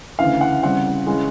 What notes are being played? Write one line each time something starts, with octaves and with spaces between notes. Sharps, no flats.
D2 C#3 E3 F5
F#5
C#3 E3 G3 C4 F#5
C#3 E3 G#3